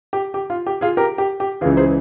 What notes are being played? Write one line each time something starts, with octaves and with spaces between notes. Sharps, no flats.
G4
G4
F4
G4
F4 G#4
G4 A#4
G4
G4
C#2 C#3 E3 F4 G#4
G#4 C5